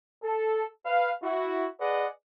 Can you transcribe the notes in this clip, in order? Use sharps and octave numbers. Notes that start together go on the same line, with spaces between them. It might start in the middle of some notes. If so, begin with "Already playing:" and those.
A4
B4 F5
E4 F#4
G#4 B4 D5 D#5 F#5